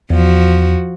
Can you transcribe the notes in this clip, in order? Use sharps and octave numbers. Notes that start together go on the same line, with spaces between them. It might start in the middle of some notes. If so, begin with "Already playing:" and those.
E2 F3 F#4